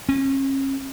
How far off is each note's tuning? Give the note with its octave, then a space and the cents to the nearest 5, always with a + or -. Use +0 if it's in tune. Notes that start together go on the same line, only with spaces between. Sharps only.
C#4 -40